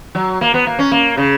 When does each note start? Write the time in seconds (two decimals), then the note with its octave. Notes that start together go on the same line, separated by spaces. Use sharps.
0.15 F#3
0.41 A#3
0.54 B3
0.67 A#3
0.79 C#4
0.91 A#3
1.17 C#3